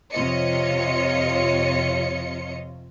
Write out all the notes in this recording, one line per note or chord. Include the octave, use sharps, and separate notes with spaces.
F2 C3 F4 C#5 D#5 C#7